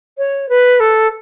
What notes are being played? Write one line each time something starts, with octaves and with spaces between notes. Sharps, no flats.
C#5
B4
A4